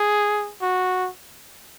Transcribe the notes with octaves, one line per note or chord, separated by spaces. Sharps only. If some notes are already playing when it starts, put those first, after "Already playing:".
Already playing: G#4
F#4